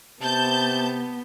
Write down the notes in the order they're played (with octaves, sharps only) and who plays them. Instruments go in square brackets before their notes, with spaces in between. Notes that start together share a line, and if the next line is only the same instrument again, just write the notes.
[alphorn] C3 [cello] B3 [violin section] A5 G6